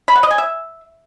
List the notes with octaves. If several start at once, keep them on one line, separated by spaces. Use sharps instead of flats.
B5
F#5
D#5
G#5
E5